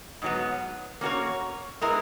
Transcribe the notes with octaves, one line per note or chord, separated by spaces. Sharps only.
G#2 F#3 B3
A#3 C#4 F#4 A#4 C#5
G#3 B3 E4 A#4